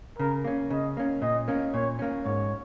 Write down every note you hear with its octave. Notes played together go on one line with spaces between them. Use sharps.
C#3 A#4
A#3 C#4
C#3 D#5
A#3 C#4
A#2 D#5
A#3 C#4
A#2 C#5
A#3 C#4
G#2 C#5